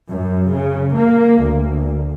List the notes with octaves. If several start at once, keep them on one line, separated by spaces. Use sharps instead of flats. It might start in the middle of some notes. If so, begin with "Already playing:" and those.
F#2
C#3
A#3
D2